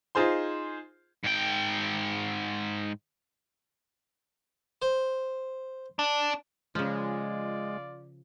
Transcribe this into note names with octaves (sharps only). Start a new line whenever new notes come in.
D#4 F4 G#4 C5 C6
G#2 G5
C5
D4
C#3 F3 G#3 F4 D5